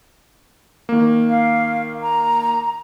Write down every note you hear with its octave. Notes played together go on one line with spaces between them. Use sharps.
D#3 A#3
F5
A#5